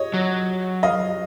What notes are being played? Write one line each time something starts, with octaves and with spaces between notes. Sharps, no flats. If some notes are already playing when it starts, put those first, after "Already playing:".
Already playing: C#5 D#5
F#3
D#5 F5